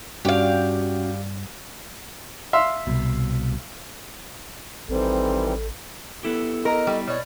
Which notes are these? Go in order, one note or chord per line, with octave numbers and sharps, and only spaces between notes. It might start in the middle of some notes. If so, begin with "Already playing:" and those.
G2 C#4 D4 F#4 G4 F5
E5 F5 C6
C2 B2
A1 D#3 E3 G3 C4 A4
B3 E4 G4 A4
A#4 D#5
G3
B2 C#5 D5